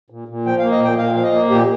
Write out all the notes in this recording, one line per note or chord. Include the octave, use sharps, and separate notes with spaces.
A#2
A#2
F3 G5
A#3 F5
D#5
A#2 G5
A#2 F5
F3 F5
D#5
A#3
A#2 G4